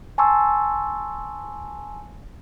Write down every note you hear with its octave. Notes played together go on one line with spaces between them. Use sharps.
G#5 A5 C6 C#6 E6